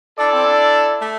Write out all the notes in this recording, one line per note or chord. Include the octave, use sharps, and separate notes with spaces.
D4 E4 A4 D5
C4
D4
A3